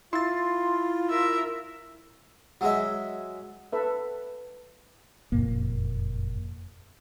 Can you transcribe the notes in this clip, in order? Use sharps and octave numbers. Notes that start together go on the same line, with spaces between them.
E4 F4 C6 A6
A#4 E5
F#3 G#3 E5
A4 B4 E5
F#1 F2 A#2 A#3